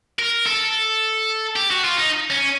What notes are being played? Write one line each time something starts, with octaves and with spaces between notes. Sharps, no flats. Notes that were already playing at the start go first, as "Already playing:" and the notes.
A#4
A4
G4
F#4
F4
D#4
C#4